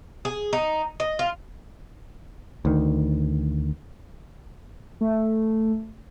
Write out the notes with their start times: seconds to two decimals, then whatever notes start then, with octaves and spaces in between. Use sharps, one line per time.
0.25 G#4
0.53 D#4
1.00 D#5
1.19 F4
2.65 D2 D#3
5.01 A3